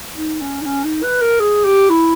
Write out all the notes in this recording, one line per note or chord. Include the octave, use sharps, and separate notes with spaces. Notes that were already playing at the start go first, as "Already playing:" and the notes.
D#4
C#4
D#4
C#4
D#4
B4
A#4
G#4
G4
E4